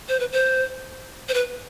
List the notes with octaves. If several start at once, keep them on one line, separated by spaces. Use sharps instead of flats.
C5
B4
C5
C5
B4